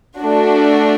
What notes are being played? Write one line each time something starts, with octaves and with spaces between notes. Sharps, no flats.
A3 D4 F#4